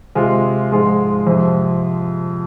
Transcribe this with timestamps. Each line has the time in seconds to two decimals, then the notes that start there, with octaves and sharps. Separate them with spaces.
0.15 C3 G#3 F4
0.71 G#2 F3 G#3 F4 G#4
1.26 F2 C3 F3